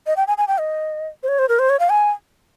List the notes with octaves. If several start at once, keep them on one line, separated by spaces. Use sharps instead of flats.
D#5
G5
G#5
G#5
G5
D#5
C5
C#5
C5
A#4
C5
C#5
F5
G#5